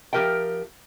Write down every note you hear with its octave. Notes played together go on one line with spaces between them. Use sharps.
F3 G4 A#4 E5 G5